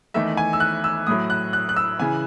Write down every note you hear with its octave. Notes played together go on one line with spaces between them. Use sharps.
E2 D#3 A3 E5
G#5
E6
F#6
E6
A2 F#3 A3 D#6
F#6
F#6
F#6
E6
C#3 E3 G#5